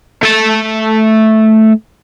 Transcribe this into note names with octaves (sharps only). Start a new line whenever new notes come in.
A3 A5